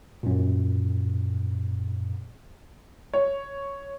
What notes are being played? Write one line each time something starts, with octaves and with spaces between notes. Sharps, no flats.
F#2 A#2
C#5